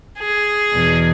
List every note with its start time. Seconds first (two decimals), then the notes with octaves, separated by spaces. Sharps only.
0.19 G#4
0.73 E2 B2